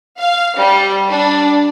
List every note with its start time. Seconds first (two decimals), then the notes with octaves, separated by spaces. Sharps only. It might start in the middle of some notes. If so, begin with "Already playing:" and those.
0.18 F5
0.57 G3
1.08 D4